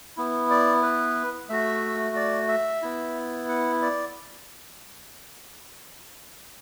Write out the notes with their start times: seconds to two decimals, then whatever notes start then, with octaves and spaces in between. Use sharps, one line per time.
0.17 B3 E4
0.50 D5
0.83 B4
1.49 A3 F#4 E5
2.16 D5
2.48 E5
2.82 B3 E4
3.49 F#5
3.82 D5